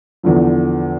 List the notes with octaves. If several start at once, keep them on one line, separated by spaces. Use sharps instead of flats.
E2 D3 F3